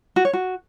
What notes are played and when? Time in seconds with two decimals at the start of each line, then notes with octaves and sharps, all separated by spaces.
0.16 F#4
0.25 C#5
0.33 F#4